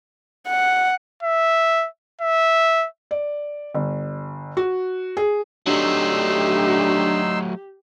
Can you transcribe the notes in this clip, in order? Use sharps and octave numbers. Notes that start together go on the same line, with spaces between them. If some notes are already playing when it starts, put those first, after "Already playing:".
F#5
E5
E5
D5
G1
F#4
G#4
F#3 A3 D4 D#4 G4 C6 E6